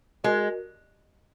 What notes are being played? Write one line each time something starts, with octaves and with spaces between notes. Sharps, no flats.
G#3 F#4 A#4 D#5